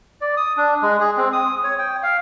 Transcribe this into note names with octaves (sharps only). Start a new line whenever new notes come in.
D5
D#6
D4
G#3
G#4
C4
D#6
C#5
G5
F5